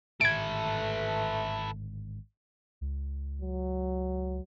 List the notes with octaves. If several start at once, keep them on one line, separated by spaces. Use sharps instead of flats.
G#1 A2 D3 A3 A4 B4 G#6 D7
C#2
F#3